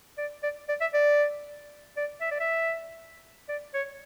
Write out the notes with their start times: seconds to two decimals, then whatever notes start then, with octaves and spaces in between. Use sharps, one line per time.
0.18 D5
0.43 D5
0.69 D5
0.81 E5
0.94 D5
1.97 D5
2.21 E5
2.31 D5
2.40 E5
3.49 D5
3.74 C#5